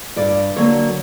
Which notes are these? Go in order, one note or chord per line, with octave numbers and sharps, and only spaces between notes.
G2 D5
D3 F#3 A#3 C#5